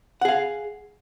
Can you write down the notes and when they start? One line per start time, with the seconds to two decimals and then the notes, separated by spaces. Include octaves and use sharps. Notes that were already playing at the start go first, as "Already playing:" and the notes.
0.21 F#5
0.25 G#4
0.28 F5